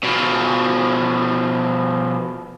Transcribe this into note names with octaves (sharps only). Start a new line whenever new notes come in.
B2 F3